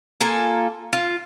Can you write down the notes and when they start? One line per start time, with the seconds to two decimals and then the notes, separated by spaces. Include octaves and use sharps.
0.21 A#3 F4 A4 G#5
0.93 F4